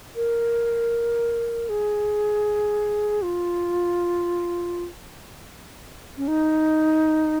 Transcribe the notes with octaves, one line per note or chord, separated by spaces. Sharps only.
A#4
G#4
F4
C#4
D#4